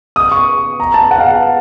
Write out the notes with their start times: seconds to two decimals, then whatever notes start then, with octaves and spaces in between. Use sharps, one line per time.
0.16 D#6
0.32 C#6
0.80 A#5
0.94 A5
1.11 F#5
1.18 F5
1.27 F#5